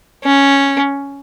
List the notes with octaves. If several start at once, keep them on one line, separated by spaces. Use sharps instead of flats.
C#4